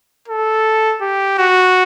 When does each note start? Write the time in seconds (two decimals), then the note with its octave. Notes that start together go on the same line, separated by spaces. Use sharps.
0.28 A4
1.01 G4
1.38 F#4